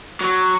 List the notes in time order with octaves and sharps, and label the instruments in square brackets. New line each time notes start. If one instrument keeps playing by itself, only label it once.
[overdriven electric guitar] F#3